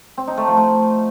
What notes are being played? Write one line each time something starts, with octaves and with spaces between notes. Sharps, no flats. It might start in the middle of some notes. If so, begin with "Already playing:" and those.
C4
D#4
A3
F3
A3